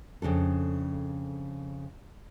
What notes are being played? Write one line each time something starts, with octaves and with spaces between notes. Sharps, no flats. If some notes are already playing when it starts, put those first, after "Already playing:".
F2 C#3 D4 A4